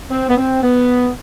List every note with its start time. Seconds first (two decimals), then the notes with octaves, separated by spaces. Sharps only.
0.11 C4
0.29 B3
0.37 C4
0.63 B3